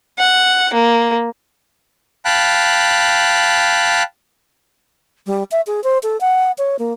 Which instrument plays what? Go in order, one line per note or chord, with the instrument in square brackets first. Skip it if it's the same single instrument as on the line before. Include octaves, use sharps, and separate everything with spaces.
[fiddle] F#5
A#3
[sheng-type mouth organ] F5 G5 A5 B5 F#6
[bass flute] G3
E5
G#4
C5
A4
F#5
C#5
A#3